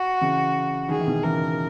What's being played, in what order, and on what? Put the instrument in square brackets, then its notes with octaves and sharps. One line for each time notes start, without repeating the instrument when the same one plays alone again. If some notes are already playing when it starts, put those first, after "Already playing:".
Already playing: [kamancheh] F#4
[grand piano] C#3 E3
[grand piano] D#3 [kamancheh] G#4
[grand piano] E3
B2 D#3
[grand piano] C#3 E3 [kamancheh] A#4